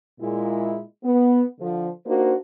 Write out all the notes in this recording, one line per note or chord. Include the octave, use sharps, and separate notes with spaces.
A#2 G#3 E4
B3
D3 F3
A#3 D4 D#4 F#4 C5